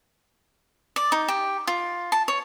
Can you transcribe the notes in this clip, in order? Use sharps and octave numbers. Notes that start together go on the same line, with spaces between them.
D5
D#4
G4
F4
A5
C#5